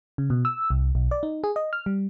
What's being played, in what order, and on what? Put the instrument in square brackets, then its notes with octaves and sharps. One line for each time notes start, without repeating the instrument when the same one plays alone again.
[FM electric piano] C#3
B2
E6
C2
B1
D5
D#4
G#4
D#5
F6
G3